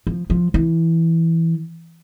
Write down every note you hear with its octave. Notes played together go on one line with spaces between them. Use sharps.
F3
F3
E3